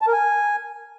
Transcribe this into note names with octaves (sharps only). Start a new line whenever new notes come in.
A5
A#4
G#5